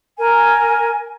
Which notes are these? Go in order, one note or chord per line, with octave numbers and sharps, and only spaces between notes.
A#4 G#5